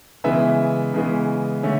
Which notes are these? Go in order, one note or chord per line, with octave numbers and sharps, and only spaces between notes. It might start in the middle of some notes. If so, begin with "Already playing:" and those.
C#3 E3 G#3 B3 E5
C#3 E3 G#3 B3
D3 A3 C#4